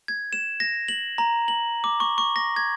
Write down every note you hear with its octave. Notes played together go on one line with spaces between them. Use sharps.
G#6
E7
A#6
F#7
A#5
F#7
D6
C#6
C#6
A#6
G#6